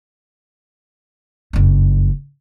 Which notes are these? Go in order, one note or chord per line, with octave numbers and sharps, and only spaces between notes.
F#1 F2